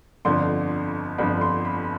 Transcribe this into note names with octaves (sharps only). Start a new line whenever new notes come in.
G1 F2 D3 F3 C6
G1 F2 D3 F3 B5
C6
B5